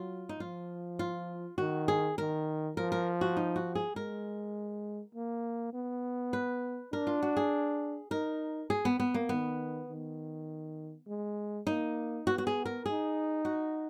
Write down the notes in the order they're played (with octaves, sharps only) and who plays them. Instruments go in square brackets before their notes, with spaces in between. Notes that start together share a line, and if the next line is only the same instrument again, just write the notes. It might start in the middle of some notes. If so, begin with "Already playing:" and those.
Already playing: [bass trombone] F#3 [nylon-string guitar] F4
[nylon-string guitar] D#4
[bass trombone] F3 [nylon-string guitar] F4
[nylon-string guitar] F4
[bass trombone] D#3 [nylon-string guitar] F#4
[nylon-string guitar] G#4
[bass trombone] D#3 [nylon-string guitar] A#4
[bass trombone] F3 [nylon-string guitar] A#4
[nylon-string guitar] A#4
F#4
D#4
F#4
G#4
[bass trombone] G#3 [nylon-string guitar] A#4
[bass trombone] A#3
B3
[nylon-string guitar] B4
[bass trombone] D4 [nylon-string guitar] A#4
[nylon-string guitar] F4
F#4
G#4
[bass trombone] D#4 [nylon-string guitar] A#4
[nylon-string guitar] G#4
B3
B3
A#3
[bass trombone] D#3 [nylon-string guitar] B3
[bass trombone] D#3
G#3
[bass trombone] A#3 [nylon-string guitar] D#4
[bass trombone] B3 [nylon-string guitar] F#4
[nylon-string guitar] F#4
G#4
A#4
[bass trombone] D#4 [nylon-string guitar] G#4
[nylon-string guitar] F#4